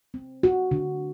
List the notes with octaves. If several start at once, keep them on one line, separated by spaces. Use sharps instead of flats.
C4
F#4
D3